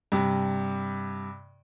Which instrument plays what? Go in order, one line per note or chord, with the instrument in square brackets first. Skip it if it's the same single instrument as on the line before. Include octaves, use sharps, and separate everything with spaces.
[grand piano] G2 C3